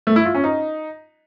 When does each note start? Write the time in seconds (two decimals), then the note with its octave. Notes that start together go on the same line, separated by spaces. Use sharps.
0.07 A3
0.16 E4
0.25 F4
0.34 C#4
0.44 D#4